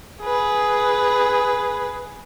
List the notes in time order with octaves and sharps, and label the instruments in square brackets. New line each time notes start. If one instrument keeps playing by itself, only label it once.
[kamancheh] G#4 B4